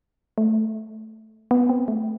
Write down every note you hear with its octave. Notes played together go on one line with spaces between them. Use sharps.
A3
B3
C4
A3